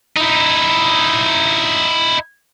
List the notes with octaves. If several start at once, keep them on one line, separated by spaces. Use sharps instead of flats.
D#4 E4